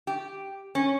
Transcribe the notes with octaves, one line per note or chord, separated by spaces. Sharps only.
G4
C#4